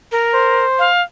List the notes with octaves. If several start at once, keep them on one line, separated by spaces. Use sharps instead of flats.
A#4
C5
F5